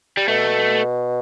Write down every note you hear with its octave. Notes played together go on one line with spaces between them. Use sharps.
G3
B2 A3